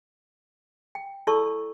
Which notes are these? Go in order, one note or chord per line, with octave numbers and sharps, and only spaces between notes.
G5
E4 A4 D5 A5 C#6 E6